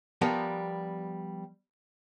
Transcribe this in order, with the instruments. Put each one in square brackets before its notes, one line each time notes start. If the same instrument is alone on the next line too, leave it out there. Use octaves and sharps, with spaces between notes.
[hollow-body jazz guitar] F3 G3 B3 G4 A#4 G5